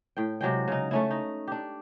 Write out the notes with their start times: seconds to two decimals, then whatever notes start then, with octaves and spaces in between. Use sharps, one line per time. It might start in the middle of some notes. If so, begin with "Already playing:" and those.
0.17 A2 G5
0.41 C3 F#3 G#3 G5
0.68 C#3 D#4
0.91 A3 C#4 E4
1.11 D#4
1.48 D4 G4